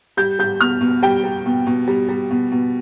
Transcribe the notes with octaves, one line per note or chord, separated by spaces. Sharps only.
G3 G6
G3 G6
B2 F6
B2
G3 G5
G3
B2
B2
G3
G3
B2
B2